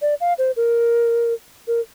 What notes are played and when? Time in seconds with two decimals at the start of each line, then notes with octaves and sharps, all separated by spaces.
0.02 D5
0.21 F5
0.38 C5
0.56 A#4
1.67 A#4